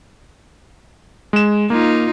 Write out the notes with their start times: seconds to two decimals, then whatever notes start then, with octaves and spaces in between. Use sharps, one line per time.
1.33 G#3 E7
1.70 A#3 D#4 F4